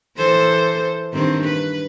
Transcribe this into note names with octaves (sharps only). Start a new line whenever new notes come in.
E3 A4 C5
G2 D#3 C4
B4